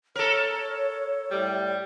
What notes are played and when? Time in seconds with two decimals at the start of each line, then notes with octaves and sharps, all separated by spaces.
0.15 A4 A#4 C#5
1.30 A2 G3